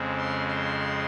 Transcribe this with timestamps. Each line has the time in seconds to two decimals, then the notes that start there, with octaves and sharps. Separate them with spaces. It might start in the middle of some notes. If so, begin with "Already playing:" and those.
Already playing: F2 C#3 G#3 C4
0.17 C6
0.48 C6